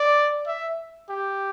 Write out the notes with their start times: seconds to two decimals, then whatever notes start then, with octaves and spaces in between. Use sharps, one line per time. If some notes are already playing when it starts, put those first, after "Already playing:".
Already playing: D5
0.47 E5
1.10 G4